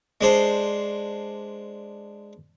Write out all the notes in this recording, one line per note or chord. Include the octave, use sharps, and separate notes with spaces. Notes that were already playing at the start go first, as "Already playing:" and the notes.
G#3 D4 C5